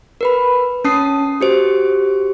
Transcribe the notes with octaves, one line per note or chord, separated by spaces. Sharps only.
A#4 B4 B5
C#4 A5 D#6 C7
F#4 G4 C5